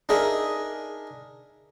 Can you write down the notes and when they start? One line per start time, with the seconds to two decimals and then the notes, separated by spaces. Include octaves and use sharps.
0.09 D4 D#4 G#4 A#4 E5